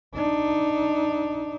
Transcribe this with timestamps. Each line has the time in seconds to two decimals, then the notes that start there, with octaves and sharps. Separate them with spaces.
0.14 D4 D#4